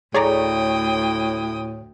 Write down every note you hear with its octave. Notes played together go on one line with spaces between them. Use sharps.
D2 A2 G#4 C#5 D5 G5 A#5 D#6